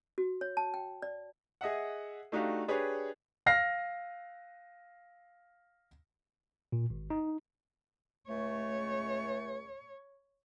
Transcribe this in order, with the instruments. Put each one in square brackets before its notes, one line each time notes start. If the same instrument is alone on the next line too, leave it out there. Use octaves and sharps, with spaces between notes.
[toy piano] F#4
C#5
A5
G5
D5
[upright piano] G#4 D#5 E5 F#5
A3 D4 D#4 F#4 G4 F5
D4 G4 G#4 B4 C#5
[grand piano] F5 F6 A#6 C7
[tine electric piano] A#2
G#1
D#4
[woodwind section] C#2 A3 [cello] C#5